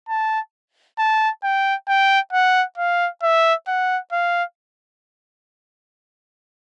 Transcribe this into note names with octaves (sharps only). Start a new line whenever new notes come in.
A5
A5
G5
G5
F#5
F5
E5
F#5
F5